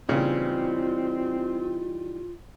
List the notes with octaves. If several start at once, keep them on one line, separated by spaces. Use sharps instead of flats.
A#2 C#3 E3 G3 C4 D#4 F4